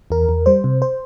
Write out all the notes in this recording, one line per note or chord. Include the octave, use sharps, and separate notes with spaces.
E2 A#4
E2
G3 C5
C3
C5